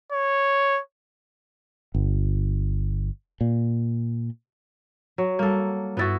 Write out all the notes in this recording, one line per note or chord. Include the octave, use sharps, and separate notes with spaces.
C#5
G1
A#2
F#3
G3 A#3 A4
G2 B3 E4 F#4 A6